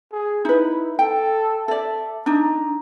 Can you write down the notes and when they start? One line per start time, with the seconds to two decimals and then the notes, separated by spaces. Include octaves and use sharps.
0.12 G#4
0.45 D#4 E4 B4
0.99 A4 G5
1.68 A4 D5 E5
2.26 D4 D#4 A#5